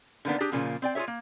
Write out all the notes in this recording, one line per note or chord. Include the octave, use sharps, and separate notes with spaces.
D3 D#3 A#3 B3 D4
D4 G4 G#4
A#2 C#3 F3 A#3
C4 D5 G5
F4 G#4 A4 C#5 E5
A#3